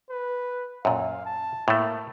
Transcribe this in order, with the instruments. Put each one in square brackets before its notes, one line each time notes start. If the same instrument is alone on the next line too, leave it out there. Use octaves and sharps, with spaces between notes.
[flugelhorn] B4
[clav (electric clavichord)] F#2 A#2 [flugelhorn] F5
[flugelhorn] A5
[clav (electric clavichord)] A2 A3 [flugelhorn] A#3